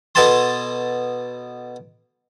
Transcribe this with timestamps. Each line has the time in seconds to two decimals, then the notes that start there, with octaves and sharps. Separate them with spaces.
0.15 B2 B3 A4 G#5 A5 C6